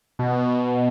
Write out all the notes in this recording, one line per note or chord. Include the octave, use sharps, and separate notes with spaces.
B2